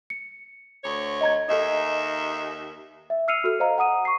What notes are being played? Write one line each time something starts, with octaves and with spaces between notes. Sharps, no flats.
C#7
D2 C#5
D#5 A#5 G#6
D#2 D#4 A4 D#5 E5
E5
E6 F6 C7 C#7 D#7 F7
F#4 A4 F6
C5 D#5 F5 A#5
F#5 A#5 D#6 D#7
C#6 C7